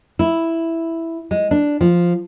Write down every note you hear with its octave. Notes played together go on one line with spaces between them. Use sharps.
E4
G#3
D4
F3